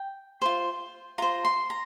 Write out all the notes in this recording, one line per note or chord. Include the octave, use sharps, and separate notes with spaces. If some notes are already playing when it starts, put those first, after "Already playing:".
Already playing: G5
F4 C5
F4 C5 A#5
C6
A#5